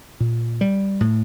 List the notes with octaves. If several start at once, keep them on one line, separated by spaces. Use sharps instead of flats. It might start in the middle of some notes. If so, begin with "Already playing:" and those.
A#2
G3
A2